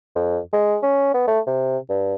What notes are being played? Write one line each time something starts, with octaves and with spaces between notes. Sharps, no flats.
F2
G#3
C#4
B3
A3
C3
G2